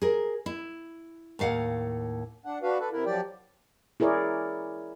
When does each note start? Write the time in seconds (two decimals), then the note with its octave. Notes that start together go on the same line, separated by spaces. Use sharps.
0.02 G#4 A#4
0.46 E4
1.39 D#2 A2 F5 F#5
2.45 D4 F#5
2.63 D4 F#4 B4 F5
2.80 A4 B4
2.92 C3 E4 A#4
3.06 F3 F#3 G4 D5 G5
4.00 E4 G#4 A#4 C#5 D5